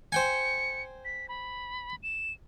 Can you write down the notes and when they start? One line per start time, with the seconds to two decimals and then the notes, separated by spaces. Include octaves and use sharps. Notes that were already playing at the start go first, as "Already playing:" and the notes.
0.12 C5 G5 G#5 C#7
1.05 B6
1.29 B5
2.03 E7